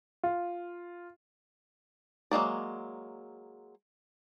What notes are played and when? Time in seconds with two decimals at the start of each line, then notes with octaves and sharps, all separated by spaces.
0.23 F4
2.31 F#3 G#3 A#3 D5